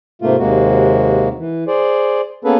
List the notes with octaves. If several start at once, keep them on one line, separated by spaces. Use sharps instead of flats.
G#2 C3 A3 A#3 F4
D#2 C3 G#3 A#3 F#4
E3
G#4 C5 D5
A#3 B3 C#4 G#4 A4 B4